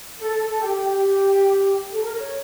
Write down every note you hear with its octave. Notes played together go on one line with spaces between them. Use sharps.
A4
A4
A4
G4
G4
G4
A4
A#4
C#5